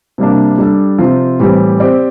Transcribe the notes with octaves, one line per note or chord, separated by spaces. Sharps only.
C3 G3 A#3 D4
G3 D4 A4
C3 F3 C4 F4
A2 E3 G3 C4 G4
C4 G4 D5